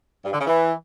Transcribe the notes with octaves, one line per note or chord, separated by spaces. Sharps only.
G2
D3
C#3
E3